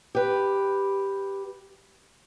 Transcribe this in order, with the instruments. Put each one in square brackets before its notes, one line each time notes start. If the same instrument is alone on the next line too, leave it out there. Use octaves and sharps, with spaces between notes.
[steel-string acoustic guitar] G4 B4